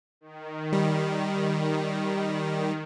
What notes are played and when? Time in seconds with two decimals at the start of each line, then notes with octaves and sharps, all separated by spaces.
0.21 D#3
0.73 G3